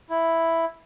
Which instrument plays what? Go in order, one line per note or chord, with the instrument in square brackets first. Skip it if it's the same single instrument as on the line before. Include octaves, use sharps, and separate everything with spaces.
[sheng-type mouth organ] E4